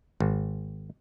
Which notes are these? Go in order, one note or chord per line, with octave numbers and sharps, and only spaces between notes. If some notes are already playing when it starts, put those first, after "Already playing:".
G#1